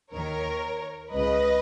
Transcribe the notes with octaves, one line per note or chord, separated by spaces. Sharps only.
D#2 D#3 A#4 C#5
C#2 C#3 B4 D#5